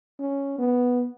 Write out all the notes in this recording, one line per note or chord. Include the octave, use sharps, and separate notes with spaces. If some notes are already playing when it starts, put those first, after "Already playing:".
C#4
B3